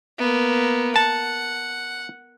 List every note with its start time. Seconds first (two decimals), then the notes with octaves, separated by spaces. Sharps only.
0.18 A#3 B3
0.96 F#5 A5